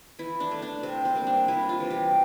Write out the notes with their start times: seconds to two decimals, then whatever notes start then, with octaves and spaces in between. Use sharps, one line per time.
0.19 E3 E4
0.40 D4
0.51 A3
0.62 D4
0.83 C3 C4
1.05 C4
1.15 G3 A#3
1.27 D4
1.48 C3 E4
1.69 F4
1.80 E3 G3
1.90 G4